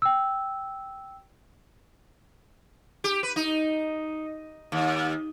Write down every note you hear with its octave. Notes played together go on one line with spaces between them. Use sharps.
G5 E6
G4
B4
D#4
D#2